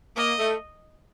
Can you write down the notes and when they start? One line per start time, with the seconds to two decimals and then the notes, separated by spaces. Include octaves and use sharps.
0.16 A#3 D#5
0.39 A3